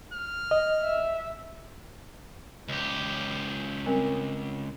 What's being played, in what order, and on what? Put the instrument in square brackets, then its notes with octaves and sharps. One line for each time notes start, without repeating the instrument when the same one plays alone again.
[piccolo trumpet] F6
[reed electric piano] D#5
[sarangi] E5
[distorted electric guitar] C#2 G4
[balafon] G3 C4 A#4